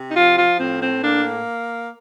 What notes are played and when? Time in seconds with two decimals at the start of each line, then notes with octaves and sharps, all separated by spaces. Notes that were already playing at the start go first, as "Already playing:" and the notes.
Already playing: C3
0.09 D#4
0.16 F3 F4
0.37 F4
0.59 A2 C4
0.81 C4
1.03 A#3 D4